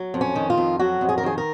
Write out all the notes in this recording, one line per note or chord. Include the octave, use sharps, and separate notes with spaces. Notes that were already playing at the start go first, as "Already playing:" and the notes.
Already playing: F#3
F2
C#4
D#3
F4
F2
F#3 F#4
F2
G#4
A#4
D#3 G#4
A#4